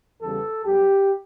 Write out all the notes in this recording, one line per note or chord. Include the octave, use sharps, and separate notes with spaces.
E2 C#3 G3 B3 A4
G2 F#3 B3 G4